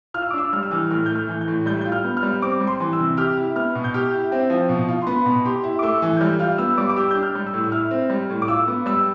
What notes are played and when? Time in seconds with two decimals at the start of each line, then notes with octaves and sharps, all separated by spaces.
0.14 F4 F6
0.22 E6
0.30 D6
0.33 D4 E6
0.53 G3 F6
0.63 E6
0.71 E3 F6
0.90 A2 F6
1.06 A3 G6
1.15 F6
1.29 E3
1.41 G6
1.48 A2
1.66 G3 G6
1.81 F4 G6
1.92 F6
2.04 B3
2.17 F6
2.23 G3
2.42 C4 D6
2.60 G3
2.67 C6
2.80 E3
2.93 E6
2.99 C3
3.17 G4 F6
3.37 E4
3.55 B3 F6
3.75 B2
3.84 G6
3.94 G4 F6
4.12 E4
4.32 C4 G5
4.50 F3
4.69 B2
4.89 F4
5.02 C6
5.07 B3 B5
5.26 B2
5.45 G4 C6
5.63 E4
5.79 D6
5.82 A3 E6
6.02 E3
6.17 G6
6.21 G3 F6
6.39 F4 F6
6.58 B3 E6
6.78 G3 D6
6.89 D6
6.96 G4 E6
7.11 D4 G6
7.23 F6
7.35 G3
7.47 E6
7.54 A2
7.64 E6
7.72 E4 F6
7.91 C4
8.10 G3
8.30 A2
8.42 D6
8.48 F4 E6
8.68 B3
8.86 G3 E6